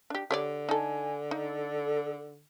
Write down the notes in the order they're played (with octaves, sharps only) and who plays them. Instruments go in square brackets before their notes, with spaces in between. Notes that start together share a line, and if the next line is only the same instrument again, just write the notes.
[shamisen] D4 G4
[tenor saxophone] D3 [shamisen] G4 C#5 D5
[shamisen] D#4 A4 [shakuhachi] G#5
[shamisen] D#4 [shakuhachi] A4